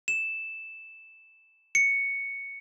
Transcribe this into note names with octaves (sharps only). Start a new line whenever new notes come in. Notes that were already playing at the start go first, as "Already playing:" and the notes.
E7
C#7